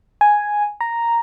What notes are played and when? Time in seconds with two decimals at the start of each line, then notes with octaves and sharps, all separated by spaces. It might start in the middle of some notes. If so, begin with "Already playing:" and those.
0.21 G#5
0.81 A#5